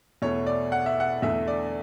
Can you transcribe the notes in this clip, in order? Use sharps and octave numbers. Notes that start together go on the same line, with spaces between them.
E2 B2 A3 C#5
D5
F#5
E5
F#5
E2 D3 A3 D4 E5
D5